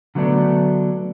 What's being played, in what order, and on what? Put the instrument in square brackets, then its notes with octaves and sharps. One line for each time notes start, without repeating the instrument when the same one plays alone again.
[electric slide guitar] D3 F#3 A3 B3 D4